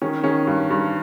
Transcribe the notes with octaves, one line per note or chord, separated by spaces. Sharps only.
D#3 C#4
D#3 C#4
G2
G2